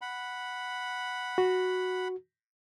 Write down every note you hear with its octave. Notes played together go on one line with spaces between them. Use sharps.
F#5 B5
F#4